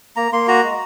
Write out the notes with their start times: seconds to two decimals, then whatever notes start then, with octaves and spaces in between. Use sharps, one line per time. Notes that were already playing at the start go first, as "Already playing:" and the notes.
0.16 A#3 A#5
0.32 A#3 C6
0.48 F#4 A#5
0.63 G#3